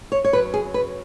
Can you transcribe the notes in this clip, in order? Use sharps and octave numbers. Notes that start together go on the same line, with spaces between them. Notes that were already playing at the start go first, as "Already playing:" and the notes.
C#5
C#5
F#2 F#3 B4
G#4
B4